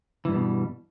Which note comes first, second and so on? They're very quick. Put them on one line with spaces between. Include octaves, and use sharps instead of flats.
E3 G2 G3 B2